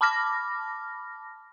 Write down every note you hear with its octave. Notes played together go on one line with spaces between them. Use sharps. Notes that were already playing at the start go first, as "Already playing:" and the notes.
A5 B5 D6 F6 A#6